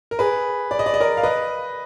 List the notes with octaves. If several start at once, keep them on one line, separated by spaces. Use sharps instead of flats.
A#4
G#4 B4
D5
D#5
D5
D#5
A#4 D5
F5
B4 D#5